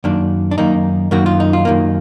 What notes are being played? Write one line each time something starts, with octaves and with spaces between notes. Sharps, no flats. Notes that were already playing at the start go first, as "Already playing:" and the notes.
F#2 D#3 A#3 D4
D4
F#2 D#3 A#3 D#4
F#2 D#3 A#3 F#4
F4
D#4
F4
F#2 D#3 A#3